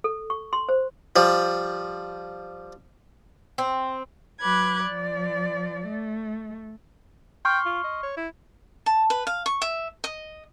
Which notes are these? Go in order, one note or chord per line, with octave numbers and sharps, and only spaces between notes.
A4
C#6
C6
C5
F3 G3
C4
F#3 B4 B5 D6 F#6 G#6
F3 D5
A3
G5 C6 C#6 F6
F4
D#5
C#5
E4
A5
B4
F5
C#6
E5
D#5